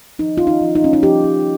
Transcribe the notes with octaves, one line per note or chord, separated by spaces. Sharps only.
F3 D#4
C#4 F4
D#4
F3
D#4
A#3 C#4
D#4
F3 G4
C#4